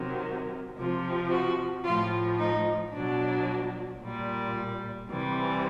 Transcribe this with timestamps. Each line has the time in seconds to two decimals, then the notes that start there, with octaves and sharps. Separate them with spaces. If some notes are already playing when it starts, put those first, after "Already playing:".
Already playing: C3 D#3 F#3
0.76 C3 F3
1.30 F#4
1.84 A2 F3 F4
2.38 D#4
2.92 B2 F#3 D4
4.00 A#2 G3
5.08 C3 E3 G3